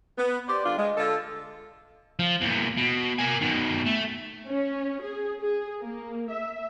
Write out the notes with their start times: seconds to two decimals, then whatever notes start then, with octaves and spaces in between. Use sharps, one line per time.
0.17 B3
0.48 G4 C5 D5
0.64 D3 G3 D4 F4
0.77 G#3
0.96 D3 F4 A4
2.19 F3
2.41 E2 A#2
2.77 B2
3.19 A#3 G#5
3.42 B2 D#3
3.86 A3
4.47 C#4
5.02 G#4
5.40 G#4
5.81 A#3
6.30 E5